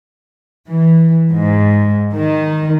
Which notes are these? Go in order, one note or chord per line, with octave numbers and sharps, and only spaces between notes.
E3
G#2
D#3